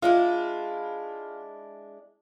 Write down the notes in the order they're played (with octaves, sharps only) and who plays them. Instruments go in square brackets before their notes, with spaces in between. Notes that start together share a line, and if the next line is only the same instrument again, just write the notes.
[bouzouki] G#3 D4 E4 [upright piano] F4